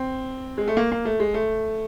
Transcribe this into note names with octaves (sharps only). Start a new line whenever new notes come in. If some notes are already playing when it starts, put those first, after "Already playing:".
Already playing: C4
G#3
A3
A#3
A#3
A3
G#3
A3